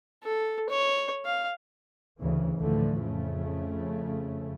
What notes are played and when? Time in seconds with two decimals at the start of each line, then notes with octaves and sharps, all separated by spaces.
0.23 A4
0.69 C#5
1.25 F5
2.20 D2 C#3 E3
2.58 D2 A2 D3 E3 F3 A3
3.02 F2 C#3 A3